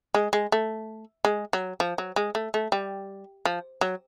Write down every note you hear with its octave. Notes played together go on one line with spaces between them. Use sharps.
G#3
G#3
A3
G#3
F#3
F3
F#3
G#3
A3
A3
G3
F3
F#3